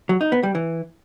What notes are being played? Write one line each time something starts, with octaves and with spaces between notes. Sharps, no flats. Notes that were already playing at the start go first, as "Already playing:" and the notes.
F#3
D#4
B3
G3
E3